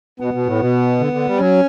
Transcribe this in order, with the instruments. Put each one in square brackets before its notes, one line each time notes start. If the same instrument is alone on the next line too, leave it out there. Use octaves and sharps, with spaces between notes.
[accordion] B2 [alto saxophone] B3
[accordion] B2
A2
B2
D3
D3
G3
[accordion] F#3 [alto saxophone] C#4